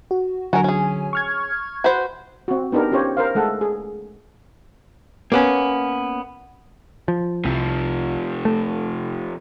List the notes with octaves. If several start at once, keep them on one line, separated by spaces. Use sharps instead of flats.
F#4
D3 F#3 F#4 A#4 G#5
C#4 G#4
C#6 F6 G#6
F#4 B4 C5
C4 F#4
B3 D4 D#4 G4 A#4
C#4 F4 G4 C5 C#5
A#4 C5 F5
G#3 A3 A4 F#5
G#4
A#3 B3 C#4
F3
C2 C3 F3
A3